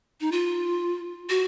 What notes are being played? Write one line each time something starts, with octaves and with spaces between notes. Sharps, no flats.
D#4
F4
F#4